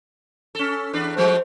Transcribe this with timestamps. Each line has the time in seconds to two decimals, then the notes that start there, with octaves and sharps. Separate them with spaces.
0.55 C#4 A4
0.93 E2 D4 B4
1.17 F3 G#3 A3 C5